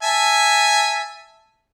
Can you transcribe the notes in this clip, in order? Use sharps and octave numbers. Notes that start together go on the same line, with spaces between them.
E5 G#5 A5